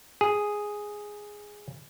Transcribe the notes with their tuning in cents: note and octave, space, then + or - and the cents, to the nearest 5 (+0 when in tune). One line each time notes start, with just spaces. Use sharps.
G#4 +0